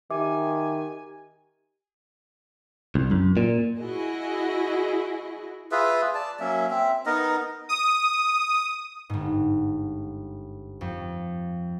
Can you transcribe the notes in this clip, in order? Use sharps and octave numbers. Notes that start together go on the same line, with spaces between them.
D#3 G4 E5 G#5 D6
C2
F#2
A#2
E4 F#4 G#4 D#5
F4 G#4 B4 E5
D5 A5
F#3 A#3 C#4 E5
C4 E5
B3 D#4 A#4 D#5
D#6
G1 G#2
F2